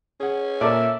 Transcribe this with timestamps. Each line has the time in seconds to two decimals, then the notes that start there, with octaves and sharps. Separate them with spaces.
0.20 C#4 G#4 F#5
0.61 A#2 A4 A#4 D5 E5